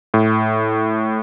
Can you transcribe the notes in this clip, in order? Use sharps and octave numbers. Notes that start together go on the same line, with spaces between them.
A2